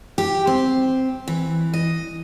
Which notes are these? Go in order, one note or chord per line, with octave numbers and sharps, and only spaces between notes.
G4
C4
E3
D#5